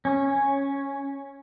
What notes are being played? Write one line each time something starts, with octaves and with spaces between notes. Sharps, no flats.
C#4